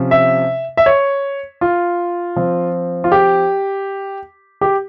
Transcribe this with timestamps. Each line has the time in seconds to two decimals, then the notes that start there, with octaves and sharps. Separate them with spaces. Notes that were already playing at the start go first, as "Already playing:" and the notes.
Already playing: C3 F3 C#4
0.11 E5
0.77 E5
0.86 C#5
1.61 F4
2.36 F3 C4
3.04 F4
3.12 G4
4.61 G4